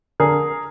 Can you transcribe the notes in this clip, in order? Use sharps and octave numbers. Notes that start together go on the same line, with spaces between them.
D3 G#4 A#4